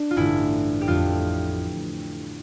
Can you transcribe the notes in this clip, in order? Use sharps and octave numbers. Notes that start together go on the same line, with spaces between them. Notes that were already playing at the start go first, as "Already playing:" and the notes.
Already playing: D4
F4
A1 G2 D3 A3 E4
G4
F2 D3 A3 F4